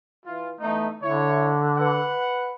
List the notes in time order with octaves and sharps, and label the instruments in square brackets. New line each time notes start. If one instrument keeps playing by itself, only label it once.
[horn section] E3 F4
[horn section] E3 B3 D#4 [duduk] A3
[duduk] D3 [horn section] E4 C#5
[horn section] B4 F#5